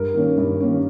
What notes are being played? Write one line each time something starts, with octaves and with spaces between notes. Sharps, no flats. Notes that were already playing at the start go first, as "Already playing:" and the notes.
Already playing: G2 A#4
D#3 A#3 C#4
G2
D#3 A#3 C#4